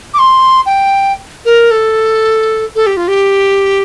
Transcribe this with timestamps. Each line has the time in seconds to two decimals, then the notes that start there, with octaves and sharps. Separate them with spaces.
0.14 D6
0.19 C6
0.66 G5
1.45 A#4
1.71 A4
2.75 A4
2.86 G4
2.97 F4
3.08 G4